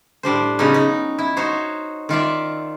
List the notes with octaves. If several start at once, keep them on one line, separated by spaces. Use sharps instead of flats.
A2 G3 D4 C5
C#3 F#3 B3 C#4 D#4
D#4
E4
D#4 F#4 C5 C#5
D#3 F4 D5 E5